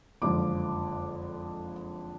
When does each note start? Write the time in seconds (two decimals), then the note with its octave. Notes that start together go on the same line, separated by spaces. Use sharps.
0.22 F#1 F2 D3 F3 G#3 D6